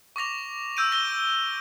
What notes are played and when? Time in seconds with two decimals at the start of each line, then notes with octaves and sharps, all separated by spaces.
0.16 C#6 D6 A#6 F7
0.77 E6 G6 D7 D#7
0.92 E6 A#6 G7